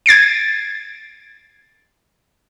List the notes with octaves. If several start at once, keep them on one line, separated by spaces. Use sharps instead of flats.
G#6 A6 C7 D7